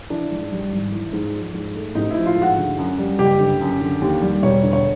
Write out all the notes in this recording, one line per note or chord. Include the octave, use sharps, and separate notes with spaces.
E3 D4
G#2
G3
G#1
E3
G#2
F3
G#2
A3
A1 D#4
E4
F3
F4
G#2
F#4
D3
F#2
G3
F#1 G4
D3
F#2
D3
D#2
G3
E1 C#5
D3
C#5